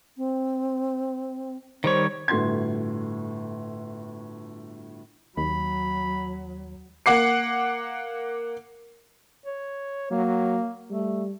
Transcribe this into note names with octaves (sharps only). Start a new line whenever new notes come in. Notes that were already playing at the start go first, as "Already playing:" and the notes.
C4
D#3 G3 C5 C#5
G1 A2 F#4 C6 G#6
D#2 F#3 B5
A#3 F#5 D6 C7
C#5
F#3 A#3
G3 A3